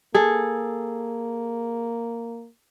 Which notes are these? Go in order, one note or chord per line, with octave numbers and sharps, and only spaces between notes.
A#3 G#4 A4